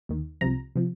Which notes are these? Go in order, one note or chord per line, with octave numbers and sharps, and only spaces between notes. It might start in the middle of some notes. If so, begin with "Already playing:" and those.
D#2 D#3
C2 C3 F3 A#5
C3 F3